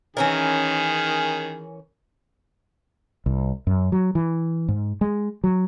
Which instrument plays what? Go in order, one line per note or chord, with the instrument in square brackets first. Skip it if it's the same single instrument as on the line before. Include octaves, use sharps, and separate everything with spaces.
[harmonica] D#3 G#4 [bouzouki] E3 C#4 A#4
[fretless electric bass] C2
F#2
F#3
E3
G#2
G#3
F#3